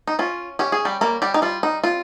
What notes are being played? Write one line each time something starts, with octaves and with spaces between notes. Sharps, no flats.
D#4
C#4 F4
C#4 G4
G#4
G3 G4
G3 A#3 A#4
G3 G4
D#4
G3 F4
D#4
C4 F4